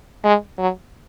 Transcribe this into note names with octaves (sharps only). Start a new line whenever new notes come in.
G#3
F#3